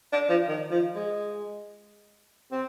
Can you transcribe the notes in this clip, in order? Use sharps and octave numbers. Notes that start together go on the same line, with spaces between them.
D4
F3
D#3
F3
G#3
C4